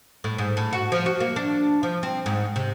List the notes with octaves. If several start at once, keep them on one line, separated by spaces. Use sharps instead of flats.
A2
G#2
A2
F#4
F3
F#4
A#3
D4
F3
C4
G#2
C3